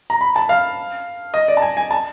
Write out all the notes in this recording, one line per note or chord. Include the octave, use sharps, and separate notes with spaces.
A#5
B5
A5
F5
D#5
D5
A5
G#5
G#5
A5